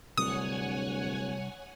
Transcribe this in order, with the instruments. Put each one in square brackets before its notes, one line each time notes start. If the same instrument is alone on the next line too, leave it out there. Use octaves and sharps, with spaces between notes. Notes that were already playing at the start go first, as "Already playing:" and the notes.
[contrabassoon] D1 [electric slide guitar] C3 G3 D4 [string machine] C#5 F#5 G#5 [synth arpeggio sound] D#6